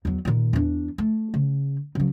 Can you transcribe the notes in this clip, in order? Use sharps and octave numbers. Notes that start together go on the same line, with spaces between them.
E2 F#3
A#2 D#3
E2 D4
A3
C#3
C#3 F#3